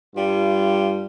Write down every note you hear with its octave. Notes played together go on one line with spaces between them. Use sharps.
G2 G3 F4